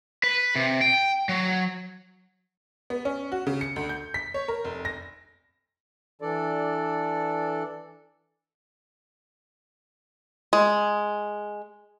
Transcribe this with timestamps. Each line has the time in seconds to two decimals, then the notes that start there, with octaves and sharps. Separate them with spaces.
0.23 B4
0.56 C3
0.81 G5
1.29 F#3
2.90 B3
3.05 C#4
3.32 F#4
3.47 C#3
3.61 C#7
3.76 D2
3.89 G6
4.14 B6
4.34 C#5
4.48 A#4
4.64 F1
4.85 A#6
6.22 E3 D4 A4 D5
10.53 G#3